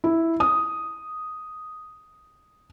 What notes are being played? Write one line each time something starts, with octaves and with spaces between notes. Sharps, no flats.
E4
D#6